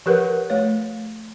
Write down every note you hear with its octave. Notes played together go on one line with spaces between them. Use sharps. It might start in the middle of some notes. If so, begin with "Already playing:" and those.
F3 G4 A#4 B4 F#5
A3 C#5